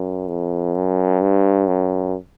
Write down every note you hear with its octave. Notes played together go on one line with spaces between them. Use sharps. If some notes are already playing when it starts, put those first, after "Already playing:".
Already playing: F#2
F2
F#2
G2
F#2